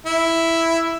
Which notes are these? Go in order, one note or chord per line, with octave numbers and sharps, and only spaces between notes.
E4